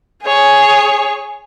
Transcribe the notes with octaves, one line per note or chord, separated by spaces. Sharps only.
G#4 C#5